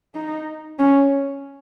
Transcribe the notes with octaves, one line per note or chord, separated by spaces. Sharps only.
D#4
C#4